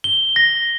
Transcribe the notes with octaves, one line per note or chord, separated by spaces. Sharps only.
G7
A#6